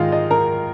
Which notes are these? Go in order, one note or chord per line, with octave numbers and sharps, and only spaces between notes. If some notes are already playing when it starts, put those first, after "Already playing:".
Already playing: G#2 D#3 G#3 F4 D#5 F5
D#5
A#4 A#5